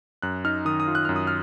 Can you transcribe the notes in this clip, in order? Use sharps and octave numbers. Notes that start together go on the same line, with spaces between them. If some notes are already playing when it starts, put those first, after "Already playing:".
F#2 F#6
D#4 F6
D#3 D#6
D#6
F4
F#6
F#2 F6
D#6
F6